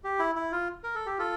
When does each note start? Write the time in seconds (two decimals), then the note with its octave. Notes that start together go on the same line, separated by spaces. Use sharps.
0.04 G4
0.19 E4
0.35 E4
0.52 F4
0.84 A#4
0.95 A4
1.06 G4
1.18 F4 A4